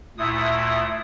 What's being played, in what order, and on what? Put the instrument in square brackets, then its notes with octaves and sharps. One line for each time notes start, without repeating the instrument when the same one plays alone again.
[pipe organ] D2 A#2 D#6 [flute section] E4